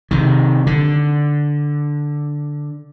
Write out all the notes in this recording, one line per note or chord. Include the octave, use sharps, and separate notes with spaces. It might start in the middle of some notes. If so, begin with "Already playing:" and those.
C3 D#3
D3